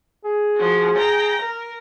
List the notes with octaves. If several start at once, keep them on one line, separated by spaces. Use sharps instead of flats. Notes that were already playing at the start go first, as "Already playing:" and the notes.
G#4
F3 F#4
G5 A#5
A#4